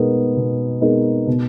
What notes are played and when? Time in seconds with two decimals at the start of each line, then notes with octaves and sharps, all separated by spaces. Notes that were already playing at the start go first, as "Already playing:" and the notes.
Already playing: B2 G#3 B3 D#4 A#4
0.36 B2
0.81 G#3 B3 D#4 A#4
1.27 B2